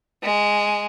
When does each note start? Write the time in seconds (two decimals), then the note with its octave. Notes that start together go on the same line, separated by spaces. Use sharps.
0.23 G#3